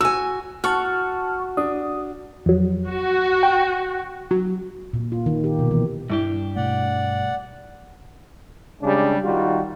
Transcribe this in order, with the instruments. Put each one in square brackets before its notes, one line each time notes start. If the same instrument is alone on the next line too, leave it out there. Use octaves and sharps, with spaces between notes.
[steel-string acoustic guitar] F#4 G#5 [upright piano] E6
[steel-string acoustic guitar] F#4 [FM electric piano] A5 C#6 F6
[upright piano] D4 [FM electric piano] D#6
[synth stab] F2 F#3
[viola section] F#4
[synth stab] G5
F#3
[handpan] A#2
F4
D#3
G4
B2
E3
[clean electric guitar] G2 D4 G4 [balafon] G3 E4
[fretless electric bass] B2 A3 [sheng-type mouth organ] D5 F#5
[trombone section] C#3 G3 G#3 D4
D#3 G3 F4 F#4